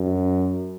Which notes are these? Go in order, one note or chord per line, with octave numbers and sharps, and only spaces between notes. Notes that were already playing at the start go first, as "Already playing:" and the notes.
Already playing: F#2